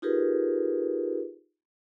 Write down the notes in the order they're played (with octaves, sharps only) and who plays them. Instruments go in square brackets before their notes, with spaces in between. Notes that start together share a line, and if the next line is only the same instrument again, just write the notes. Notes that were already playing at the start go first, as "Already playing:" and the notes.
[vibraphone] D#4 F4 G4 G#4 A#4 B4